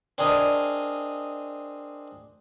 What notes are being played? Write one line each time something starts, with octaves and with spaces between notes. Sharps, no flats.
C4 D4 G#4 A#4 D#5